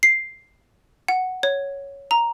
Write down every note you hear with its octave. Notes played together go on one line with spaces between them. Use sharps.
C7
F#5
C#5
A#5